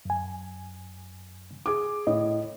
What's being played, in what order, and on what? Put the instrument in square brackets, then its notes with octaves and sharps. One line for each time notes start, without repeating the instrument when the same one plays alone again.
[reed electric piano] F#2 G#5
[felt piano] G#4 D6
[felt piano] A2 [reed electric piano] D#5